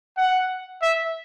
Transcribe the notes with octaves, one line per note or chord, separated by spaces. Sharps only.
F#5
E5